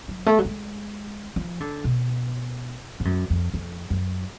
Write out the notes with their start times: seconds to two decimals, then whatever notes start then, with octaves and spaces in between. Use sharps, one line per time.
0.08 F#3
0.26 A3
0.39 F#3
0.45 G#3
1.36 F3
1.60 D3
1.84 B2
3.00 G#2
3.05 F#2
3.30 F2
3.54 F2
3.90 F#2